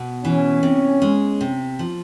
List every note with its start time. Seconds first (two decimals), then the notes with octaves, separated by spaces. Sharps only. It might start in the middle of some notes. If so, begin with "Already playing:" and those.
Already playing: B2
0.25 E3 C#4
0.63 C3
1.02 G#3
1.41 C3
1.79 F3